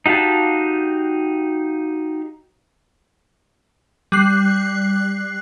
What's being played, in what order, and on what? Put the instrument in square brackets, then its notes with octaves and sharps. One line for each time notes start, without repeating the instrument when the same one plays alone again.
[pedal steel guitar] D#4 F#4 G4 F5 A5
[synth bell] G3 F#6 C7